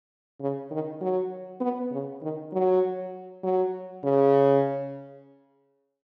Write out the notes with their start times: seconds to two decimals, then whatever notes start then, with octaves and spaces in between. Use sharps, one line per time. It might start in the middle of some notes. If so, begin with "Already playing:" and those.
0.40 C#3
0.71 D#3
1.01 F#3
1.60 B3
1.91 C#3
2.22 D#3
2.53 F#3
3.43 F#3
4.04 C#3